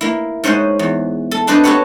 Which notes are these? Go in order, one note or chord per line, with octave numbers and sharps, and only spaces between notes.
A#3 E4
G#2 C#4 C5 D#5 F#5
E2
A4
C4 D4 B4 C5 D5 D#5
F#4 G4 A4 B4 C#5 F#5